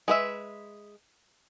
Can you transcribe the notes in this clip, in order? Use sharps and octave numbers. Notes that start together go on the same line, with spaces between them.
G#3 B4 E5